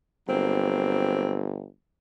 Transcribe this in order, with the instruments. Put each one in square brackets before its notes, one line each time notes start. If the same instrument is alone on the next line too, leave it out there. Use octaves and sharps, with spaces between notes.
[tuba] G1 [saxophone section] F#3 A#3 C4